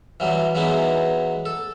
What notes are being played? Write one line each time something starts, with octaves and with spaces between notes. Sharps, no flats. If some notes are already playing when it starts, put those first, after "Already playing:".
E3 F#3 G3
E3 F#3 G#3 B3 D#4
A4